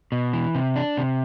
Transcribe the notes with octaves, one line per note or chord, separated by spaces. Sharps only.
B2
E3
C3
D4
C3